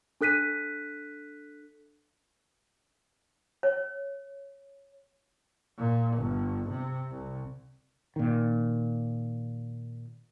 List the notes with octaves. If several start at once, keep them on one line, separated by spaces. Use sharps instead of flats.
D4 A4 F#6 B6 D#7
C#5
A#2
G1
C3
C2
A#2 D#3